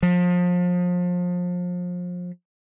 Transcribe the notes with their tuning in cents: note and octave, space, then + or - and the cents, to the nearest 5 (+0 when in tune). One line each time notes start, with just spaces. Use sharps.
F3 +30